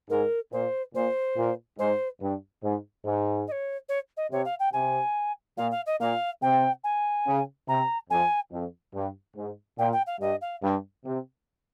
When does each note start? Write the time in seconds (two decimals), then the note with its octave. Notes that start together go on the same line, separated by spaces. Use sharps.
0.10 G#2 A#4
0.52 A#2 C5
0.95 A#2 C5
1.36 A#2
1.78 G#2 C5
2.21 G2
2.63 G#2
3.05 G#2
3.47 D#5
3.52 C#5
3.89 C#5
4.17 D#5
4.31 C3 C#5
4.45 F5
4.59 G5
4.73 C3 G#5
5.57 A#2 F5
5.71 F5
5.86 D#5
6.00 A#2 F5
6.42 C3 G5
6.84 G#5
7.27 C#3
7.68 C3 A#5
8.10 F2 G#5
8.52 F2
8.94 G2
9.36 G#2
9.78 A#2 G5
9.92 G5
10.06 F5
10.20 G2 D#5
10.41 F5
10.62 G2
11.05 C3